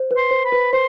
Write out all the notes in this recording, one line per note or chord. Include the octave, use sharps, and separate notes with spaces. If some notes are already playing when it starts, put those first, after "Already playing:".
Already playing: C5
B4
C6
C5
B5
B4
C5 C6